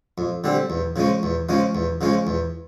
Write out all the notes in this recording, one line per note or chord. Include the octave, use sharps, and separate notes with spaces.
F2
D3 G3 C4
E2
C#3 F3 G#3 C#4
E2
C#3 F3 G#3 C#4
E2
C#3 F3 G#3 C#4
E2